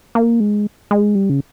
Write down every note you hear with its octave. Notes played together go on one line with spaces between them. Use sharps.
A#3
G#3
G#3
G3
C#3